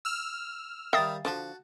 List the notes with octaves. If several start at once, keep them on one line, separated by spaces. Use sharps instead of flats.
E6 F6
D#3 G3 E5 F5 G5 D#6 A6
D3 F3 F#4 A5